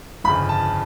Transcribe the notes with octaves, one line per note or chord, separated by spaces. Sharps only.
G1 F2 C#3 B5
A5